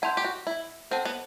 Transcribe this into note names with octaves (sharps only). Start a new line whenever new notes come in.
E4 F#5 A5 C6 G6
G4
F#4
E4
C4 A4 C5 F#5 A5
B3